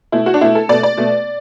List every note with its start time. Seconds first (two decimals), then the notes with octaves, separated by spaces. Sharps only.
0.12 B2 A3 E4
0.26 F#4
0.34 D4
0.41 B2 A3 E4
0.55 A4
0.69 B2 A3 D5
0.83 D5
0.97 B2 A3